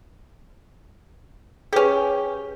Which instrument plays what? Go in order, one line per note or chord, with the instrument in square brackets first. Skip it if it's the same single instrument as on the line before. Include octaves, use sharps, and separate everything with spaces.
[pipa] C#4 G4 [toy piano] G#4 B4